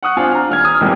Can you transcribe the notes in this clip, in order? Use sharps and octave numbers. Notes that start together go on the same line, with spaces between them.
F#5 C#6 D#6 F#6
C4 D4 F4 F5 G#5
A#5 F6
D#1 F6 G#6
D#6 F6
F1 A#1 E2 G2 C3 D#3